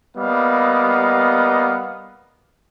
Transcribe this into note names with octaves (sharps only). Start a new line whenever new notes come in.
G3 A#3 B3 D#5 F5